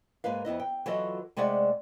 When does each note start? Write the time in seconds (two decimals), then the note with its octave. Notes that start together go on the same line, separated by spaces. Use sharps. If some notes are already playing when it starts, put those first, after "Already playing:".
0.24 G#2 G#3 A#3 B4 F5
0.45 F2 B3 E4 D#5
0.60 G5
0.86 E3 F#3 F4 F#4 A4 D#5
1.37 C3 G#3 A3 G#4 D5 F#5